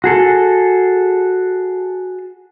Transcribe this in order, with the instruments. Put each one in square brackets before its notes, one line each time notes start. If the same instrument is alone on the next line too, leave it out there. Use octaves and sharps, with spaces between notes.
[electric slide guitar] F#4 G#4 A4